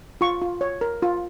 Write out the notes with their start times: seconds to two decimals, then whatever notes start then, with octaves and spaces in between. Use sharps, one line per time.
0.21 F4 C#6
0.42 F4
0.61 C#5
0.81 A#4
1.02 F4